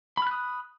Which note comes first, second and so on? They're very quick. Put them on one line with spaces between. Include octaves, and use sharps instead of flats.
B5 F6 F#6 D#6